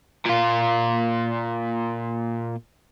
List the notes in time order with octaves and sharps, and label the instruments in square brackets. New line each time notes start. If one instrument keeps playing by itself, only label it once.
[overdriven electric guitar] A#2 F4